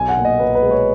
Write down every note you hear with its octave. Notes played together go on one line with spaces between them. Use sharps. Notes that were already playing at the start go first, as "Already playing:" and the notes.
Already playing: B1 G#5
F#5
A#2
D#5
B1 B4
B4
G#3
C#5